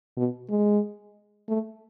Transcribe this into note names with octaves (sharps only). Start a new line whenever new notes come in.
B2
G#3
A3